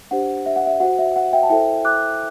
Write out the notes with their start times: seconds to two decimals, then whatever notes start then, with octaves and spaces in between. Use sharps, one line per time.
0.11 D4 G4 C5 F#5
0.46 E5
0.56 F#5
0.66 E5
0.80 F#4 C5 F#5
0.99 E5
1.16 F#5
1.33 E5 G5
1.43 A5
1.50 E4 A4 C5 E5 G5
1.85 D6 F#6